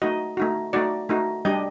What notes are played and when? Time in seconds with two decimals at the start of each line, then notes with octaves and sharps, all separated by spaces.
0.02 A3 D#4 F#4 D#5
0.37 A3 D#4 F#4
0.73 A3 D#4 F#4 D5
1.09 A3 D#4 F#4
1.45 G3 D4 G4 D#5